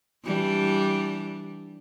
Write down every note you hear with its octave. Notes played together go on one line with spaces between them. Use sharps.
E3 G3 D4